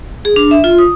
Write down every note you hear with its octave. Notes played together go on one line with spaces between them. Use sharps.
G#4
D4
E5
F4
D#6